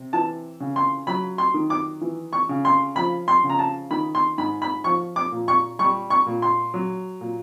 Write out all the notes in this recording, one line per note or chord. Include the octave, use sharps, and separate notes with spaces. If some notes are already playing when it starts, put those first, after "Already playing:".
Already playing: C3
E3 A5
C#3
C6
F#3 B5
C6
D#3
D6
E3
C#6
C#3
C6
F3 B5
C6
C#3
A#5
A5
D#3 B5
C6
G#2 B5
B5
F3 C#6
D6
A#2
C#6
G3 C#6
C#6
A#2
C6
F#3
A#2